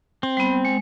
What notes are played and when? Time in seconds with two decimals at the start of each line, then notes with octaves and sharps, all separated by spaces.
0.23 C4
0.37 G3 B3
0.65 G#3